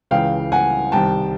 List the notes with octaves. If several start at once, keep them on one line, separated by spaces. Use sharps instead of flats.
C#2 C#3 E3 F5 G5
F#5 G#5
C2 C3 D#3 G5 A5